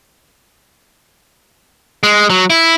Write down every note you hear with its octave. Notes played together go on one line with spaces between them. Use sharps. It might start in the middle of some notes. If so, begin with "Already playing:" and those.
G#3
F#3
E4